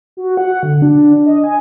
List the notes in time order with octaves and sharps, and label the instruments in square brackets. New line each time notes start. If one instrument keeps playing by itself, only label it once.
[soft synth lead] F#4
F#5
D3
D4
D#5
G#5